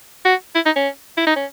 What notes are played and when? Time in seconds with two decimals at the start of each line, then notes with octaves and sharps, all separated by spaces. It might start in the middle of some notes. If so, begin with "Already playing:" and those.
0.25 F#4
0.55 E4
0.66 D#4
0.76 C#4
1.17 E4
1.27 D#4
1.36 C#4